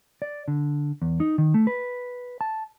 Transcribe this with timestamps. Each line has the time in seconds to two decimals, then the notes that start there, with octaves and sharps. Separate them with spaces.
0.22 D5
0.48 D3
1.02 E2
1.20 D#4
1.38 D#3
1.54 A3
1.67 B4
2.41 A5